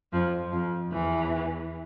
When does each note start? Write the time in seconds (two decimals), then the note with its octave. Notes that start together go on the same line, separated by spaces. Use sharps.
0.12 F2 F3
0.52 F2 F3
0.91 E2 E3